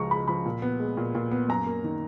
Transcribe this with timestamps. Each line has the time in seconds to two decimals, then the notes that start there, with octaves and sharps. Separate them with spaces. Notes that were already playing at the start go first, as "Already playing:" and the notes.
Already playing: C#2 C#3 F3 A#5 C#6
0.11 G#3 B5
0.28 F3 B5
0.45 A#2
0.62 B3
0.80 G#3
0.97 A#2
1.15 A#2
1.31 B3
1.49 F#2 A#5
1.67 A#3
1.84 D#3